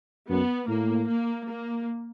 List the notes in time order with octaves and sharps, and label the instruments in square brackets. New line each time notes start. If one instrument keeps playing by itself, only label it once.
[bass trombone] F#2 [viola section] B3
[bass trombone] A2 [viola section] A#3
[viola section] A#3
A#3